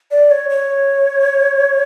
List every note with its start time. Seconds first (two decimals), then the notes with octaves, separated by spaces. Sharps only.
0.11 D5
0.31 C#5
0.50 C#5